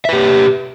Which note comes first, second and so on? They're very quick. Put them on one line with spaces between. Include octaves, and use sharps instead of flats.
E5 B4 G4